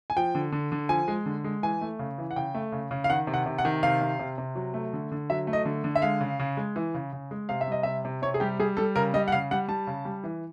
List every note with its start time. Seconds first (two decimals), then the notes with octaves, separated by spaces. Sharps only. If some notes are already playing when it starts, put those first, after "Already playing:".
0.10 G#5
0.17 F3 G5
0.35 D3
0.52 D3
0.72 D3
0.89 F3 G#5
1.08 G#3
1.26 D3
1.44 G#3
1.63 E3 G#5
1.81 A3
1.99 C#3
2.18 E3
2.31 F#5
2.36 C#3 G5
2.54 A3
2.72 C#3
2.91 C#3
3.04 F5
3.10 D#3 F#5
3.27 C3
3.34 F#5
3.46 C3
3.58 F#5
3.65 D#3
3.83 C3 F5
4.01 C3
4.19 C3
4.38 C3
4.55 F#3
4.74 A3
4.93 D3
5.12 D3
5.30 F#3 E5
5.47 A3
5.53 D#5
5.65 D3
5.84 D3
5.95 E5
6.02 G#3 F5
6.21 C#3
6.39 C#3
6.57 G#3
6.76 E3
6.94 C#3
7.13 C#3
7.31 G#3
7.49 C3 F5
7.61 E5
7.67 G3 D#5
7.83 C3 E5
8.05 C3
8.22 C3 C#5
8.34 G#4
8.40 G3 G4
8.59 G3 G#4
8.77 G3 A4
8.96 C#3 A#4
9.14 G3 D#5
9.28 F#5
9.32 C#3 F5
9.51 G3 F#5
9.68 G3 A5
9.87 C#3
10.05 G3
10.24 E3